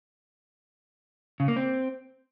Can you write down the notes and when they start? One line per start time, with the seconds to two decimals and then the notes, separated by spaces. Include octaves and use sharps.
1.40 C#3
1.48 A#3
1.56 C4